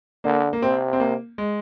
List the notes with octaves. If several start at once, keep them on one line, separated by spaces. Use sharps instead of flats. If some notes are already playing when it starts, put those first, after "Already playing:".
D3 A#3
A#3
C3 C4
C4
A#3
G#3